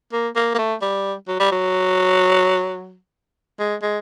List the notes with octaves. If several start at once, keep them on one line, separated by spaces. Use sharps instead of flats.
A#3
A#3
A#3
A3
G3
F#3
G3
F#3
G#3
G#3